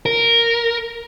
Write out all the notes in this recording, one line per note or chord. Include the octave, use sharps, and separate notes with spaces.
A#4